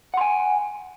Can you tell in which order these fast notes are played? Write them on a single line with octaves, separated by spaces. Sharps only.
F#5 C6 G#5